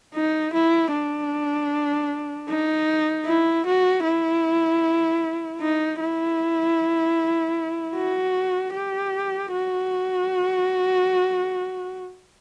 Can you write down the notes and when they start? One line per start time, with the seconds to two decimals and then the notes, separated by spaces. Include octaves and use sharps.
0.15 D#4
0.54 E4
0.92 D4
2.49 D#4
3.26 E4
3.66 F#4
4.04 E4
5.61 D#4
6.00 E4
7.95 F#4
8.74 G4
9.52 F#4